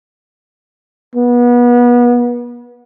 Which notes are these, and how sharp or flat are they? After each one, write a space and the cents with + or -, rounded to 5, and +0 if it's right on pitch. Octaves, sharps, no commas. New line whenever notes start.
B3 -30